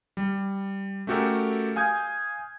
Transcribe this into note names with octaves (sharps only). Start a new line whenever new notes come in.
G3
A3 C#4 F#4 G4 A4 A#4
F5 G#5 D#6 G6 G#6